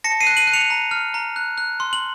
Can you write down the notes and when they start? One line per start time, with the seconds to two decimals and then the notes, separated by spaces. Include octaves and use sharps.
0.04 A5 A#6 C#7
0.20 C7 D#7
0.27 F#6
0.37 D#7 F#7
0.47 F#6
0.53 C#7 F7
0.70 A#5
0.91 F6
1.14 A#5
1.36 F#6
1.58 F#6
1.80 C6
1.93 F#7